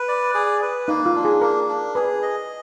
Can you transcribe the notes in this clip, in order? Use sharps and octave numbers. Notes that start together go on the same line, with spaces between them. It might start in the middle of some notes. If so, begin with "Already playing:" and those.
Already playing: B4
D5
G#4
B4
A#3 D#4
F4
D4
G#4
A#3 A#4
D4
G#4 B4
D#5